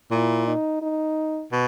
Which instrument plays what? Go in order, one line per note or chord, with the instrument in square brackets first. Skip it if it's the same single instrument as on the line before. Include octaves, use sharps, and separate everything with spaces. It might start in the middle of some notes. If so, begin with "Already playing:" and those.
[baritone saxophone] A#2 [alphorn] E4
[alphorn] D#4
D#4
[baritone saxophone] B2